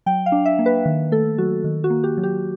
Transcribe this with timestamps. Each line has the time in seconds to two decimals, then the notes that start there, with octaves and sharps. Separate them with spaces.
0.06 F#3 G5
0.26 F5
0.32 D4
0.46 E5
0.59 A#3
0.66 B4
0.86 D#3
1.12 A3 A4
1.38 F#3 F#4
1.64 D#3
1.84 F#4
1.90 A#3
2.04 G4
2.17 F#3
2.23 G4